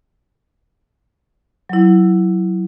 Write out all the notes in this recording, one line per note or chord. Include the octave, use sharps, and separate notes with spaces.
F#3 E4